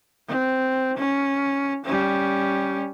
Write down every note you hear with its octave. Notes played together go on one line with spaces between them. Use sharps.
C4
C#4
G3 C#4